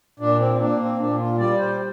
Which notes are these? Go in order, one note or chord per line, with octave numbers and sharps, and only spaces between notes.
A#2 D4
C4
A#3 D4
C4
A#2 D4
F4
G3 D5
C5